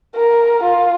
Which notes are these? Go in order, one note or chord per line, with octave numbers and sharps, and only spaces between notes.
A#4
F4